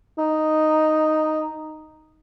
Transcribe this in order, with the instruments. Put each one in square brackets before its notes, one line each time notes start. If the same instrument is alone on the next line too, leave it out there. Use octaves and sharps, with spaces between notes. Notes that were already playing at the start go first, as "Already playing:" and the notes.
[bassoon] D#4